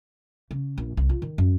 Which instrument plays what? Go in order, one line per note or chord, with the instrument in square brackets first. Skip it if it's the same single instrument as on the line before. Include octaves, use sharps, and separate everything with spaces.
[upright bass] C#3
A#1
C2
F4
D#3
F#2